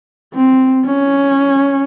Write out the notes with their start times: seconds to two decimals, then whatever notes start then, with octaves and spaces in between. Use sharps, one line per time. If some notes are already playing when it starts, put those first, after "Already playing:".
0.34 C4
0.86 C#4